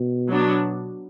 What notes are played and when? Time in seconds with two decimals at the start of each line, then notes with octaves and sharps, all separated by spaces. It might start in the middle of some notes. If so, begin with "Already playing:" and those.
Already playing: B2
0.29 F#3 B3 D4